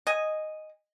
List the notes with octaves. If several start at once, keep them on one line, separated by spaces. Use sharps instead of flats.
D#5 G#5